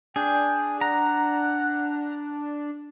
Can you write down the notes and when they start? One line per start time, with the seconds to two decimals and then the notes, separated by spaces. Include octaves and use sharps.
0.16 D4 G#4 G5
0.81 F#5 A#5